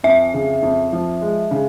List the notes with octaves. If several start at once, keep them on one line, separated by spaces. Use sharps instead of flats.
F2 E5
C#3
F2
F3
G#3
C#3